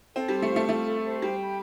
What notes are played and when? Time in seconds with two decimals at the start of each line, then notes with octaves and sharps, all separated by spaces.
0.15 C4 A4
0.28 G3 C5
0.42 A3
0.50 F4
0.56 A3
0.68 A3 F4
0.87 A4
1.04 C5
1.22 G3 G5
1.39 B5